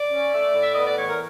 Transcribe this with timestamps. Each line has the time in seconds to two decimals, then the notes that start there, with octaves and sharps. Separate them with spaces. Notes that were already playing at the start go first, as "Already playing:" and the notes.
Already playing: D5
0.11 C#4
0.33 A3
0.54 A2
0.62 E5
0.73 B3 D#5
0.85 D5
0.97 E3 C#5
1.10 A#4